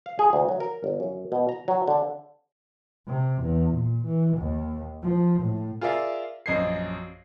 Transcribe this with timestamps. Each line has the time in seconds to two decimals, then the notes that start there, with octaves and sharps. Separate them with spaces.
0.06 F5
0.19 G#4
0.33 D2
0.49 F#3
0.60 A#4
0.84 G1
1.00 F#2
1.32 B2
1.49 A#5
1.68 F#3
1.87 D3
3.08 C3
3.42 E2
3.73 A#2
4.05 E3
4.38 D#2
5.03 F3
5.42 A2
5.81 F4 G#4 A#4 D5 E5 F5
6.46 A#1 F#2 D#5 G#6 C7